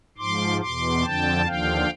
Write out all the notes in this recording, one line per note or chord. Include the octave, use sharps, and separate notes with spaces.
G#2 F3 C6 D6
E2 B2 C6 D6
F2 D3 F3 G5 A5
D#2 D3 F3 F5 G5